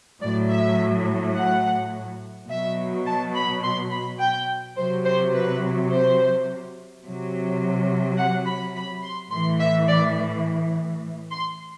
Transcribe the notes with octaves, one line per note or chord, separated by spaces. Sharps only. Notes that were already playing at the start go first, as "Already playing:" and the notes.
A2 F#3 D5
E5
F#5
B2 F#3 E5
A5
B5
C6
B5
G5
C3 F#3 C5
C5
B4
C5
C3 F#3
F#5
B5
B5
C6
A2 E3 C6
E5
D5
C6